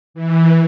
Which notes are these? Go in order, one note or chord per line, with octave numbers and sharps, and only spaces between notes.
E3